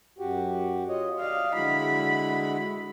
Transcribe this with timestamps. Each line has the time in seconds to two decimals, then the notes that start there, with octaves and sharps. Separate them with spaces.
0.18 F#2 F#4 G4
0.89 F4 C#5 D#5
1.20 D5 D#5 F5
1.54 D3 G#3 E4 F#4 B5